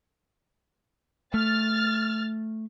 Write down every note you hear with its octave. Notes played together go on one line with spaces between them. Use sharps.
A3 F6 A6